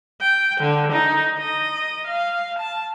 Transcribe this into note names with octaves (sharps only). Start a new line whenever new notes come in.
G5
D3
D#4
D#5
F5
A5